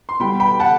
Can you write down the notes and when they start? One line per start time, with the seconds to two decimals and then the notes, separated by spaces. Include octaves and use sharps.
0.09 C6
0.20 B2 G3 G5 B5
0.40 G5 B5
0.60 F#5 A5